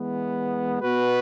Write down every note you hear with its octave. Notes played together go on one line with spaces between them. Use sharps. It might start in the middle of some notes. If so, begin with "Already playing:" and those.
Already playing: E3 G#3 B3
B2 B3 F#4 B4